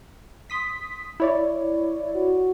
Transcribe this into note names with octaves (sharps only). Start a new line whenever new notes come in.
C6 D#6 B6
E4 C#5 D5
F#4